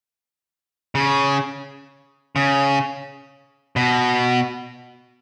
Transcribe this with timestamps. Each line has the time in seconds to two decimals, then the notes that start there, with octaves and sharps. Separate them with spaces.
0.95 C#3
2.36 C#3
3.76 B2